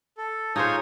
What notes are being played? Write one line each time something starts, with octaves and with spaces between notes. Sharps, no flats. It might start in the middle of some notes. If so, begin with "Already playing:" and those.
A4
D#4 F4 G#4 C5 C#5 G#5